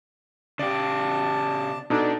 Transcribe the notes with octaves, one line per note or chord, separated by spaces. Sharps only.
C#3 D4 G4 D5 A5
B2 D4 D#4 A4